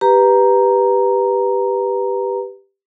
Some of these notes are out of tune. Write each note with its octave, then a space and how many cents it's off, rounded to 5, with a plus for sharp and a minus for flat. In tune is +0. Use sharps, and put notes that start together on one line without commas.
G4 +0 B4 +0 A#5 +0